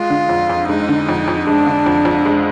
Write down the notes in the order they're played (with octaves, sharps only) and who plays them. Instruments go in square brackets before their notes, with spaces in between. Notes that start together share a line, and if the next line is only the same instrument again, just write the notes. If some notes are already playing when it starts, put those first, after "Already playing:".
Already playing: [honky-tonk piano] G#3 [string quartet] F4
[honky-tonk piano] D3
F2
F2
[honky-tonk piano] G#3 [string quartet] D#4
[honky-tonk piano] D3
F2
F2
[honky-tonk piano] G#3 [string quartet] D4
[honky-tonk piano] D3
F2
F2
G#3